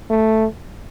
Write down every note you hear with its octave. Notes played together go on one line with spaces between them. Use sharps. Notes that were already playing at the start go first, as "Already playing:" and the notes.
A3